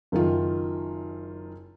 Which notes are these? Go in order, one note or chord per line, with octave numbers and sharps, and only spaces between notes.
F#1 D#3 F4